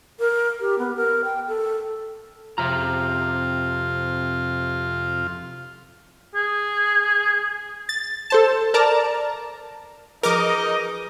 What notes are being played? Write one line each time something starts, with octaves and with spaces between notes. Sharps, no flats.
A#4
G4
B3
A#4
G5
A4
F2 C3 F4 A#5
G#4
A6
A4 C5 A5
A#4 D5 A5 A#5
F3 D#4 G#4 A#4 B4 D#5 D6